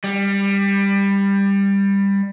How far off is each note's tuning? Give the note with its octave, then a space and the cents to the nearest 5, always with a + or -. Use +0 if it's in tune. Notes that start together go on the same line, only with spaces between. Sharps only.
G3 +15